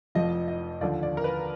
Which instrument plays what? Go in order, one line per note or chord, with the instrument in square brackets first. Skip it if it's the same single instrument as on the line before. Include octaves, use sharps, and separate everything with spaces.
[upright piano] F1 F2 F3 D#5
D#5
D#2 D3 F3 D5
D5
A#4
B4